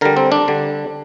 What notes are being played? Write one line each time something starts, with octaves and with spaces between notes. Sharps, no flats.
D3 G3 A#4
C4
D4
D3 G3